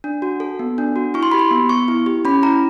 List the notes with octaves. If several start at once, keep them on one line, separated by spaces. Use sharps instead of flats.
D4
F#4
A4
B3
D4
F#4
E4 C#6
C6
G4 B5
C6
B3
B3 C#6
E4
G4
C#4 B5
E4 A#5